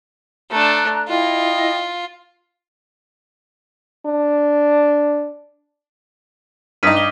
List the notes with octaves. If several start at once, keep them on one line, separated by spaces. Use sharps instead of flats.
A3 D4 A#5 F#6
E4 F4 D#5 G5
D4
G2 D#4 D#6 B6 D#7
D6 G7